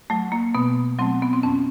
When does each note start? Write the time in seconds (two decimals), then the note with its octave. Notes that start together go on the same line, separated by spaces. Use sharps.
0.10 F#3 A3
0.32 A#3
0.55 B2 B3
0.99 F#3 A3 C4
1.22 B3
1.33 C4
1.43 F2 C#4